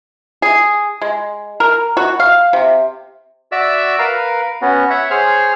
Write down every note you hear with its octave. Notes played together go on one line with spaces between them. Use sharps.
G#4
G#3
A#4
F#4
F5
C3
F#4 D5 E5 E6
A#4 B4 F5
B3 C#4 F#4
C#5 E5 F#5
G#4 C5 C#5 F6